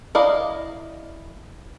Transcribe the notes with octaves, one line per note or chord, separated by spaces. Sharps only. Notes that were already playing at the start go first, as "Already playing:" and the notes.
E4 D5 D#5 F5 A#5